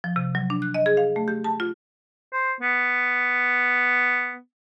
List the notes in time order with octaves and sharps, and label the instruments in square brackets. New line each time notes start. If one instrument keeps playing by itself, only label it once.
[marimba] F3
C3
F#3
D4
F#6
D#5
G#4
F5
A3
G4
A5
F4
[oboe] C5
B3